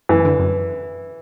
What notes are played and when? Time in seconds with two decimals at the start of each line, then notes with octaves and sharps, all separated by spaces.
0.09 F#2 E3
0.25 D3
0.39 F#2